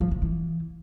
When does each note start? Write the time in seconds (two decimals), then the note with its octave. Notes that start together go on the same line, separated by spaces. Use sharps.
0.01 F3
0.11 C3
0.22 E3